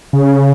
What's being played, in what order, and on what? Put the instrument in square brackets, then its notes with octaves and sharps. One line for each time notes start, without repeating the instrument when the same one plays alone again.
[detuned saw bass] C#3